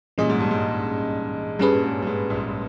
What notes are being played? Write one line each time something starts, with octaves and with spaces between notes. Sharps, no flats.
A#2 E3 G3 C#4 G#4 D#5
G#2
G2
G#2
G2 G3 C#4 G#4 B4
A#2
G#2
G2
G#2
A#1 A#2